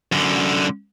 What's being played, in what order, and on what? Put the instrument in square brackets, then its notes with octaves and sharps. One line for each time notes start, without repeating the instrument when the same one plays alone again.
[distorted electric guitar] F#2 D3